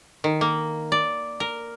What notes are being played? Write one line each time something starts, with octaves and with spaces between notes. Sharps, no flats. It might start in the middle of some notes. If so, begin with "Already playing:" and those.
D#3
A#3
D5
A#4